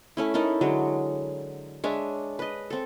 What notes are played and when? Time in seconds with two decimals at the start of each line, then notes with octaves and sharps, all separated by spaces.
0.17 A3 C#4 E4
0.34 D#4 E4 A4 A#4
0.61 D3 F#3 G#3
1.84 G#3 D4 C#5 E5
2.39 B4 D#5
2.70 C4 A4